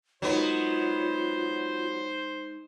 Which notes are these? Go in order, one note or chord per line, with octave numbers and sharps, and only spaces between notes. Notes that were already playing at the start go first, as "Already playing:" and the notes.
F#3 G#3 B3 D#4 F4 A#4 C5